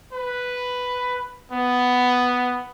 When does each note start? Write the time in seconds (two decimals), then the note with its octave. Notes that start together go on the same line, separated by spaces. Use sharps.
0.13 B4
1.52 B3